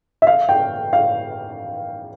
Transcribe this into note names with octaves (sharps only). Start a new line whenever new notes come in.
E5
F5
G5
F5